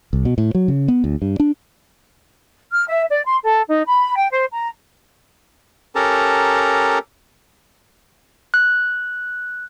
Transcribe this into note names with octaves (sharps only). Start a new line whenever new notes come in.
C2
B2
A2
F#3
C#3
B3
D2
G2
D4
F6
E5
D5
C6
A4
D#4
B5
G5
C5
A#5
C#4 G4 A4 A#4 A5 A#5
F#6